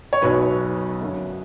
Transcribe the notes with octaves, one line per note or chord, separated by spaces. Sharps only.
C#5
B1 B2 F#3 B4
F#2 D3 F#3